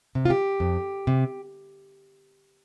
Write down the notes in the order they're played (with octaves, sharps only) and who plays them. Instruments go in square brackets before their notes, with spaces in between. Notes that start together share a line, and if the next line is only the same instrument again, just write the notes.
[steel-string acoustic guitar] C3
F4
G4
F2
C3